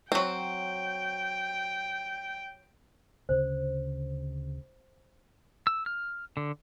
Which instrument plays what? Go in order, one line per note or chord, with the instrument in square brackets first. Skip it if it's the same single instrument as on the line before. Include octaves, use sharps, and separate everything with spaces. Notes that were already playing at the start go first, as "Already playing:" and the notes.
[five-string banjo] F#3 C4 [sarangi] G5
[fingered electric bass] D2 C#3 [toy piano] C5
[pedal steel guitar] E6
F6
D3